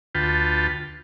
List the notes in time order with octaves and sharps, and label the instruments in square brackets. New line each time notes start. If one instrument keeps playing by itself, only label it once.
[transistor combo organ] D2 F4 B4 G5 A5